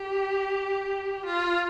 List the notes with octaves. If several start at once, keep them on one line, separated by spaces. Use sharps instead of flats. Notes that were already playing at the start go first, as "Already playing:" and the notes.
Already playing: G4
F4